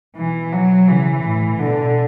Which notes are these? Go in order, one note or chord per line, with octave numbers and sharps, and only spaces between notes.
B2 E3
F#3
C#3 E3
A2
B2 D3